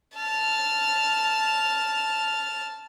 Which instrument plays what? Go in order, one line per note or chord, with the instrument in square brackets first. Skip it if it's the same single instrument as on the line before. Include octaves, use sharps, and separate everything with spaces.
[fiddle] A5 F6